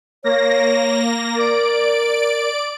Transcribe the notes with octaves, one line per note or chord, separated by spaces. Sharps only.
A#3 C#5 A#6
A#4 D5 D7